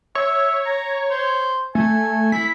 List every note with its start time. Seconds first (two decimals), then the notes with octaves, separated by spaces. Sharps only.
0.15 C#5 E5
0.66 A#5
1.11 C5
1.75 A3 G#5
2.32 E4 B6